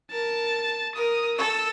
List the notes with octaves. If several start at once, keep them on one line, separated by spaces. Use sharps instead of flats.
A#4 A5
A#4 D#6
A4 E6